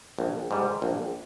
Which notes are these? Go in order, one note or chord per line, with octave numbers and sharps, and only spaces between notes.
A#1
G#2 G3
A#1